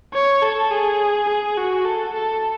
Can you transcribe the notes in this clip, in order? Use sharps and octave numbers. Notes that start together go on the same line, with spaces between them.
C#5
A4
G#4
G#4
F#4
A4
A4